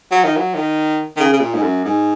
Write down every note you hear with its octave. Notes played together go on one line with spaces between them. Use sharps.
F#3
D#3
F#3
D#3
D#3
C#3
C#3
A#2
G#2
F#2
G#2